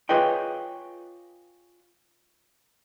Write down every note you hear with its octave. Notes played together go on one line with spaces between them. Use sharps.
F4 G#4 B4 C#5 D#5 G5